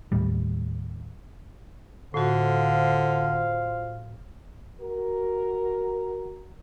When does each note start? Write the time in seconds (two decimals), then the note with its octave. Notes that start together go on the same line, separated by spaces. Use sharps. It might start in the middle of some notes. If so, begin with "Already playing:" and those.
0.12 D#2 A2 G3
2.14 A2 D3 F4 F#4 C5 F5
4.81 F#4 A#4